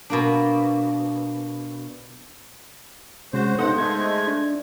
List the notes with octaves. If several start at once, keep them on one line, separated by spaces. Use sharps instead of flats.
B2 A#3 D4
C3 G#3 C#4 F#4 C5
G2 B3 D#4 A4 C5 F#5
G#3 A3 G#6
D4